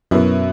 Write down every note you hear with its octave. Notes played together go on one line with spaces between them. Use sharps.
F#2 B2 B3 E4